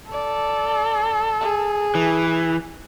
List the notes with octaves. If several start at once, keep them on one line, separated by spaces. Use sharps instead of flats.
A4 D5
G#4
E3